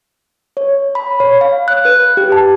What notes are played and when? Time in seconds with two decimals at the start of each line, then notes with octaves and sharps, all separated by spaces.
0.57 C#5
0.95 B5
1.20 C#5
1.41 F5
1.68 F#6
1.85 B4
2.17 G4
2.32 A5